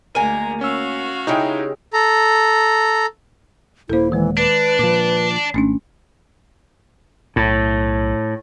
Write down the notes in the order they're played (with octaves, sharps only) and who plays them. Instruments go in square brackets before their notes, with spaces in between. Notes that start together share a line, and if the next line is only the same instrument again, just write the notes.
[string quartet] D2 G#3 A#5 [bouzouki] A#3 G#5 [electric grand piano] D#7
[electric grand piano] C#4 E6 [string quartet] F#4 F5
[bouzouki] C#3 G#3 G4 [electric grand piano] D#4 E4 G5
[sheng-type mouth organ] A4 A#5
[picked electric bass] D#1 A#3 [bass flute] E4 [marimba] A4 C5
[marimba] D#3 G#3 [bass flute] E3
[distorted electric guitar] D4 [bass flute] B4
[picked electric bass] A#2 F3 [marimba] D6
[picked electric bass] G#1 [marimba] A3 C#4 D4
[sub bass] B1 [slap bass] A2